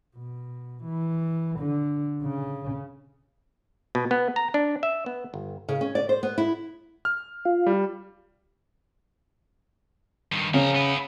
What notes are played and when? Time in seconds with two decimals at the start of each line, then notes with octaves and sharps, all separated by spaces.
0.16 B2
0.84 E3
1.59 D3
2.22 C#3
3.95 B2
4.11 B3
4.36 A#5
4.54 D4
4.83 E5
5.06 B3
5.34 G1
5.69 C#3
5.81 C#4
5.95 D5
6.09 C5
6.23 B3
6.38 E4
7.05 F6
7.45 F4
7.66 G3
10.32 G2 D#3
10.54 C#3 F3 A#4
10.76 B3 E4